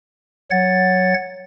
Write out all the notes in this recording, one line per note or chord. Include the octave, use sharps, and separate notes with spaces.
F#3 C#5 F#5 A6